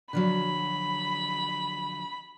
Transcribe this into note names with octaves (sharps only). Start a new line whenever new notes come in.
D3 F3 F#3 B5